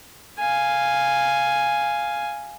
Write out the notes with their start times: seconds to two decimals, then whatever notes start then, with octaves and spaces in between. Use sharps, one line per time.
0.39 F5 G#5